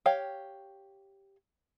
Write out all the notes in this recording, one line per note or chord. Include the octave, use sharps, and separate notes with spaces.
G4 C#5 F5 G5